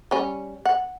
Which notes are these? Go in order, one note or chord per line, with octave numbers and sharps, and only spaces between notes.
G3 C#4
F#5